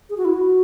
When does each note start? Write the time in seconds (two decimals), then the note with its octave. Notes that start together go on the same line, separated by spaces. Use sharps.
0.10 G#4
0.17 F#4
0.25 E4
0.33 F#4